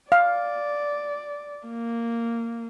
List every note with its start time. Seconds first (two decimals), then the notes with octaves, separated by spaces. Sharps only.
0.12 D5 F5
1.68 A#3